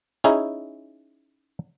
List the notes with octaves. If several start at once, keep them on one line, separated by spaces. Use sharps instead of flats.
C#4 D#4 E4 G#4